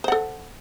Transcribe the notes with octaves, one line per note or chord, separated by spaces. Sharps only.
A4 C5 F#5